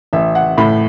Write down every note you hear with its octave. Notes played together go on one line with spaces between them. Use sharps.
A1 E5
F#5
A2 B5